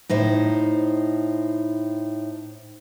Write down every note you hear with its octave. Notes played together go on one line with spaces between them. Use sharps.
A2 D#4 C5